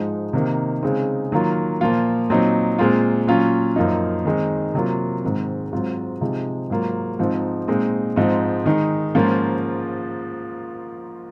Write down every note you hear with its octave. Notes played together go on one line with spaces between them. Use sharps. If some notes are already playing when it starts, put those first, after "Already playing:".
Already playing: G#2 F3 G#3 D#4
C3 D#3 A#3 D#4
C#3 G#3 C4 D#4
D#3 F#3 A#3 F4
A#2 F3 A#3 F4
A#2 F#3 C4 D#4
A#2 G#3 C4 F4
A#2 F#3 C#4 F4
F#2 F3 A#3 D#4
D#3 G#3 C4 D#4
C3 F#3 A#3 F4
G#2 D#3 G#3 C4
G#2 F#3 C4 F4
C3 F3 G#3 D#4
G#2 F#3 A#3 F4
G#2 F3 C4 D#4
A#2 G#3 C4 D#4
G#2 F3 C4 D#4
D#3 G#3 D#4
G#2 F3 A#3 C#4 F4